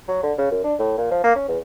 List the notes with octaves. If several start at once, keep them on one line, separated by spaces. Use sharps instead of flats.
F#3
D3
C#3
F#2
D4
A2
A#2
F3
A#3
C#4
E2